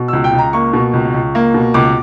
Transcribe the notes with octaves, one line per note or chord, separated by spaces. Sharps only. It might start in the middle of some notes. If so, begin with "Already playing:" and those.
Already playing: B2
C#2 E6
G5
C#2
A#5
A#3 C#6
B2
C#2
C#2
A#3
B2
C#2 D6